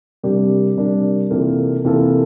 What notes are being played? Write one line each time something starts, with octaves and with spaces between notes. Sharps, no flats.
C3 G3 D4 G4 A#4
C3 G3 D4 G4 A#4
C3 E3 A#3 F4 A4
C3 E3 A#3 F4 A4